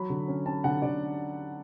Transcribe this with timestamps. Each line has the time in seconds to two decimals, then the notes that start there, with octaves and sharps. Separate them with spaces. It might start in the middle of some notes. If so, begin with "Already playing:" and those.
Already playing: F#3 B5
0.10 D3
0.28 C#4
0.46 C#4 A5
0.64 D3 F#5
0.82 D3 D5